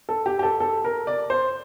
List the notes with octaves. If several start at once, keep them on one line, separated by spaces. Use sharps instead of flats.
A4
G4
G4
A4
A4
A#4
D5
C5